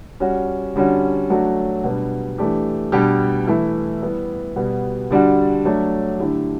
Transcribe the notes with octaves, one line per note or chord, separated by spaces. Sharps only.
G3 C#4 F#4
D3 G3 C#4 F#4
F#3 A3 D4 F#4
B2 G3 B3 D4
E3 A3 D4 G4
B2 G3 D4 G4
E3 A3 E4
G3 B3 E4 G4
B2 G3 B3 F#4
D3 G3 D4 F#4
F#3 A3 D4
D3 A3 E4 G4